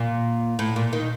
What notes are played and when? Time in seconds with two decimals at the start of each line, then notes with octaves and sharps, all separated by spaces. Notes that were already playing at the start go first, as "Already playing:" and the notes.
Already playing: A#2
0.59 A2
0.76 A#2
0.93 D#3